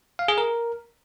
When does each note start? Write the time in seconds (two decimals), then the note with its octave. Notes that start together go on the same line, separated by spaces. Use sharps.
0.19 F5
0.28 G#4
0.38 A#4